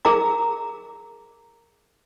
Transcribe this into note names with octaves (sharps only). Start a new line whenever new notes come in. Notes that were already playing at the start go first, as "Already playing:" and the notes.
G#4 A#4 A#5 D6